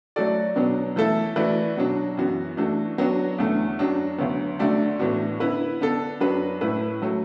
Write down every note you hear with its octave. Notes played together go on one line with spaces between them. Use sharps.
F#3 A3 F#4 A4 D5
B2 F#3 B3 D4
E3 A3 E4 A4 E5
E3 A3 F#4 B4 D5
B2 F#3 D4 F#4
F#2 E3 B3 F#4
E3 A3 D4 F#4
F#3 B3 D4 F#4
E2 D3 A3
F#2 F#3 D4 F#4
D2 D3 F#3 B3
D2 D3 A3 F#4 D5
A2 E3 B3 D4 F#4
D3 B3 E4 B4
D3 B3 D4 A4
F#2 F#3 D4 F#4 B4
A2 A3 E4 B4
F#3 A3 F#4